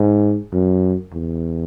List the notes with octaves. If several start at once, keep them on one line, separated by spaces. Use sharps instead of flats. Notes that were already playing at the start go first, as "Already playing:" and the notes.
Already playing: G#2
F#2
E2